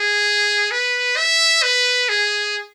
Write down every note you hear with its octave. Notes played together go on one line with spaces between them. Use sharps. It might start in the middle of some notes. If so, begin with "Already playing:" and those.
Already playing: G#4
B4
E5
B4
G#4